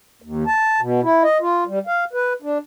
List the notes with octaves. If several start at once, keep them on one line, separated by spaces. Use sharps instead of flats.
D#2
A5
B2
E4
D#5
F4
G3
F5
B4
D4